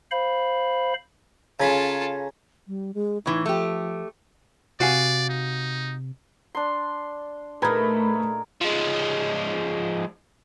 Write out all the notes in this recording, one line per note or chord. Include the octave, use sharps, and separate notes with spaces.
C5 F5 B5
C#3 F4 A4 G#5 A#5 B5
G3
G#3
A2 E3 D#4
F3 A3 G4
C3 F#4 D5 F5 G#5
D#4
D4 C6
A#2 A3 D#4 G#4 A#4 B4 B5 G#6
F3 G#3